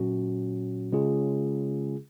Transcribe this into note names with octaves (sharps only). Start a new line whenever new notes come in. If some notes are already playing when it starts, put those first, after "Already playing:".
Already playing: A#2 F#3 C#4 F#4
C#3 G#3 C#4 F4 G#4